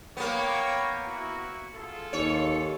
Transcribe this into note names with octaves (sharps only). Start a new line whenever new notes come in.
A#3 B3 C#5 G5
E4 F#4
F4 G#4 A4
D#2 C#5